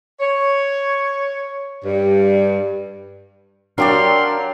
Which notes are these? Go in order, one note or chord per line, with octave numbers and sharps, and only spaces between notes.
C#5
G2
F#3 D4 G4 A#4 D5 F5 C6